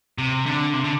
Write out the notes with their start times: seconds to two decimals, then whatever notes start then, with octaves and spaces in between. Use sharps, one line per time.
0.18 C3
0.46 D3
0.73 C3
0.84 D3